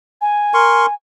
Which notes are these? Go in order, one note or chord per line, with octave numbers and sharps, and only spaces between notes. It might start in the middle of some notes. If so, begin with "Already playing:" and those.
G#5
A#4 C6 C#6